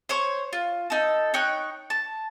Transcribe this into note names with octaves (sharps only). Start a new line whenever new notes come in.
C5 C#5 C#6
F4
D#4 A4
D#4 C#5 G5 F#6
A5